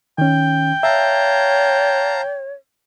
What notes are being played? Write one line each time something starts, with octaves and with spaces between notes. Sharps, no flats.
D#3 C#4 G5
C#5 E5 F5 A5 A#5